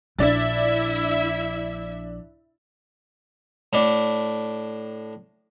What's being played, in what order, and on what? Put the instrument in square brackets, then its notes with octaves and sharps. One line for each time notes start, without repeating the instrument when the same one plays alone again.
[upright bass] A#1 [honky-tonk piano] D4 A6 [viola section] E4 E5
[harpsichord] A2 D4